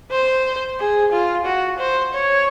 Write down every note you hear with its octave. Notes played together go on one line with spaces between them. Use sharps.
C5
G#4
F4
F#4
C5
C#5